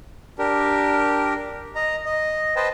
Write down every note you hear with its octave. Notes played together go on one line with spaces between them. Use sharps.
D4 G4 A#4
D#5 A#5
D#5
B4 C5 D#5 G5 A5